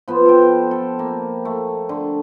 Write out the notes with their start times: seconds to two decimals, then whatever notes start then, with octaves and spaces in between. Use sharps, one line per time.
0.08 F3 B3 F4 C5
0.26 A4 G5
0.71 A4
0.99 A#3
1.45 A3
1.89 D3